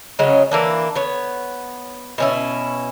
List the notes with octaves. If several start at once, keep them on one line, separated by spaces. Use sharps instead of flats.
C#3 F#3 G#3 C#4
E3 A#3 D4
B3 C#5
B2 C#4 E4